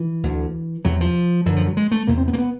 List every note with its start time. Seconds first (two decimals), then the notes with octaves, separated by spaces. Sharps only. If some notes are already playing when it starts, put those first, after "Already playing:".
Already playing: E3
0.23 D2 D3
0.85 E2 C3 F#3
1.01 F3
1.46 F#2 D3 E3
1.56 F3
1.67 F#3
1.77 G#3
1.92 A3
2.07 E2 C3 A#3
2.18 C4
2.28 B3
2.33 A#3
2.38 B3